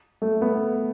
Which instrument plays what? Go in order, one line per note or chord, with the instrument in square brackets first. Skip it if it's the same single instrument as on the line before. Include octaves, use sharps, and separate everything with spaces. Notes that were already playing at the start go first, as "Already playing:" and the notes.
[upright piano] A3
B3